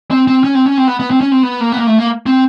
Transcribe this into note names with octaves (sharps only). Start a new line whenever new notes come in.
C4
C4
C#4
C4
C#4
C4
B3
B3
C4
C#4
C4
B3
A#3
B3
A#3
A3
A#3
C4